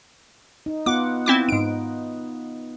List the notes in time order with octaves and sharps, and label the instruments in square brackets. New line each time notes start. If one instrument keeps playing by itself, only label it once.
[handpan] D#4
[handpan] B3 F4 F#5 [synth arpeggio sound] D6
[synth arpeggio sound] C4 E4 D6
[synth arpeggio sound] G#2 D7 [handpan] D#4